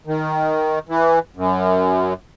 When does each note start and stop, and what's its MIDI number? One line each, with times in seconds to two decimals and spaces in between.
0.07 0.79 51
0.89 1.19 52
1.37 2.13 42